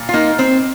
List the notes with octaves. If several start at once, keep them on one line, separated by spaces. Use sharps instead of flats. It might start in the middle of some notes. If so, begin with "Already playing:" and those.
Already playing: A#2
F4
A#3 D#4
C4